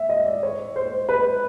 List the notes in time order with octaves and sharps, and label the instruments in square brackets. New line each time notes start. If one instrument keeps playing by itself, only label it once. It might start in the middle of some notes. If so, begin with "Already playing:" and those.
Already playing: [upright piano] E5
D#5
D5
C#5
C5
B4